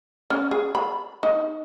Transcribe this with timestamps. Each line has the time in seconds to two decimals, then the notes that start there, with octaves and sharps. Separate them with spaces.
0.30 C#4
0.51 G#4
0.75 B5
1.23 D#4